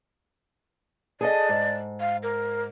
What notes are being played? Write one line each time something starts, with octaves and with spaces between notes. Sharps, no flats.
G#4 A4 D5 D#5
G#2
F5
A#4